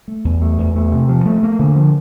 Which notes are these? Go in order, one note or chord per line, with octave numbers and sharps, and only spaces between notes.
A3
E2
A3
E2
A3
C3
F3
A3
A#3
D3
F3